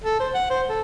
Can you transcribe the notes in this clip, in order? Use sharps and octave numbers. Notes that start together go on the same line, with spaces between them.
A4
C5
F#5
C5
A4